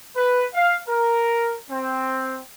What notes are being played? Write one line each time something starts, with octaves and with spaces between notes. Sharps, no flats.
B4
F5
A#4
C4